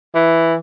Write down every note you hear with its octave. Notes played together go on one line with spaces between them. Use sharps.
E3